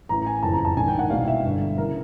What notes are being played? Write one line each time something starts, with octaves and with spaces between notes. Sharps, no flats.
A1 A2 E3 A#5
G#5
F#1 F2 C#3 E3 A5
A#5
A5
A#1 G#2 D#3 G#5
G5
F#5
C2 B2 F5
E5
G1 G2 D3
C#3 E3 A#4